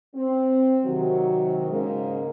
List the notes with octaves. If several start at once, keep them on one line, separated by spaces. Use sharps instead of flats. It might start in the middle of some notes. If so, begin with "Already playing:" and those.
C4
C3 D#3 F#3
G#2 C#3 G#3 A#3 C#4 A#4